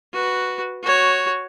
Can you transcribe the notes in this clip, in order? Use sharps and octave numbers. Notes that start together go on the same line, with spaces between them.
F#4 B4
F#4 C#5